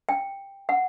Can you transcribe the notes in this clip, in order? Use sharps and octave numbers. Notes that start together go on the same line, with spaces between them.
G5
F#5